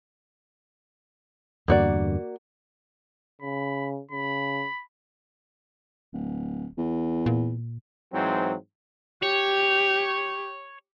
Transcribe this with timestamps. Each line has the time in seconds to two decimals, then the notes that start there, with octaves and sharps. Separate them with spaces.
1.68 E2 G2 D3 A#3 F#4 D5
3.41 C#3 B5
4.11 C#3 B5
6.13 D1
6.77 E2
7.26 A#2
8.13 G#2 E3 F#3 C4
9.23 G4 C#5